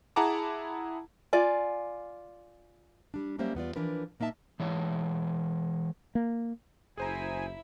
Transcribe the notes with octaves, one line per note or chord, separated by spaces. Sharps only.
E4 G#4 F#5 A5 A#5 D6
F4 D5 G#5
G3 D4
F#3 G3 A#3 C#4 C5 E5
E2 B3 F4 D5
E3 F3 D4 A#4 B4
A#2 A#3 D#4 E5 A5
E3 G#3 C#5
A#3
F#1 E4 G#4 C5 E5 G#5 A#5